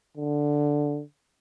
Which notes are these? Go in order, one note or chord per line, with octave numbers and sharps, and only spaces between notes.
D3